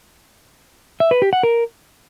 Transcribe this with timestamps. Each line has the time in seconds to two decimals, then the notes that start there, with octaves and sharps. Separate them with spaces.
1.00 E5
1.11 B4
1.22 G4
1.33 F#5
1.43 A#4